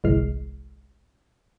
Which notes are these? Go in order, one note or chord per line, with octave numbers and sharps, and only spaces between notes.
G1 C2 E3 G#3 F6 C7